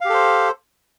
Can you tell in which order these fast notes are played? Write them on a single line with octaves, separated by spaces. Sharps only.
F5 G4 A4 C5